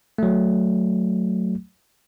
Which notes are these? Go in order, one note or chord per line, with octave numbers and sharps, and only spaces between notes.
F#3 A3